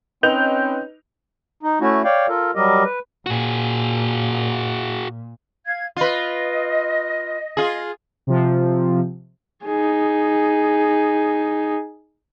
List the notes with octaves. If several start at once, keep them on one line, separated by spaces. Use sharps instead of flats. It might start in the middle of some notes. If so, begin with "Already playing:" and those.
C4 C#4 D#4 B4 G6 F7
D#4
A3 C#4 E4 F#4
C#5 D5 F5 G5
F4 A4 A#4
F#3 G3 G4 A#4 D#5
B4
A#2 F#4 G#4
F5 G#6
F4 B4 D#5
F4 G#4
C3 F3
D#4 G#4